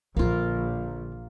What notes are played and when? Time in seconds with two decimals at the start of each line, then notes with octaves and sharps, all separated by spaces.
0.17 A#1 D3 F3 A#3 F4